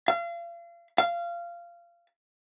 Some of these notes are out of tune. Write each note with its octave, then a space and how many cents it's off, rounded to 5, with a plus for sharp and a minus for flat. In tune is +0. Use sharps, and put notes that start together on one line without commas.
F5 -35
F5 -20